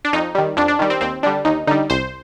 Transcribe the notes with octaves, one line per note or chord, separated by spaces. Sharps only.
D4
F2 D#4
D#3 G3
F2 D4
D4
D#3 G3
C4
D#2 C4
D3 G3 D4
D#2 D#4
D3 G3 D#4
C2 C5